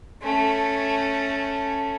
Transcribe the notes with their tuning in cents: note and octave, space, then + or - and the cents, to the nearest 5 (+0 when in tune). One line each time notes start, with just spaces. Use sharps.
A3 +0 C#4 +0